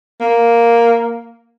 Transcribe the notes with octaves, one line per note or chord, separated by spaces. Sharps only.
A#3